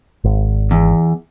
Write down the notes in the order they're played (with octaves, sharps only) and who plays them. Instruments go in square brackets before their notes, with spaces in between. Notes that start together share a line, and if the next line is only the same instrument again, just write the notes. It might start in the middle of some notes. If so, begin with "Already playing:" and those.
[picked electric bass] G#1
[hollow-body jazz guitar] E2